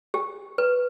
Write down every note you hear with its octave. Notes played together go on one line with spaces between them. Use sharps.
G4
B4